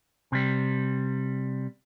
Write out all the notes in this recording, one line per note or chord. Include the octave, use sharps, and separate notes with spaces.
C3 G3